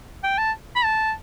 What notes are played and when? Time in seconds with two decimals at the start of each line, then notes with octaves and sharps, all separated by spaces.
0.23 G5
0.38 A5
0.75 B5
0.84 A5